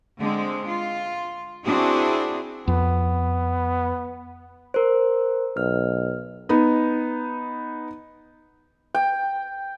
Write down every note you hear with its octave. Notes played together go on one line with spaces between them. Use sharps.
D3 G#3 C4
F4
C4 D4 E4 F#4 G#4
F2 B3
A#4 C5
B1 F6
B3 D#4
G5